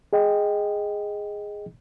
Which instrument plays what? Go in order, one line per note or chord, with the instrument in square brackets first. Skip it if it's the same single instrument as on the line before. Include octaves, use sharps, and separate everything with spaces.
[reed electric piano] G#4 D#5 G5